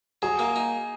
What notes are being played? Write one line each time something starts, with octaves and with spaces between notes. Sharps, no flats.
F#3 G#4
A#3
D#4